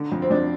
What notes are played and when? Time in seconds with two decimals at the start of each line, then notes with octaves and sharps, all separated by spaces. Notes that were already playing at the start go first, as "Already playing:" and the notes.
Already playing: D3
0.12 F2
0.22 C4
0.30 F2 D4